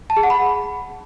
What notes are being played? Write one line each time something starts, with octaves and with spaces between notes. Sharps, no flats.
A5
G#4
F#5
B5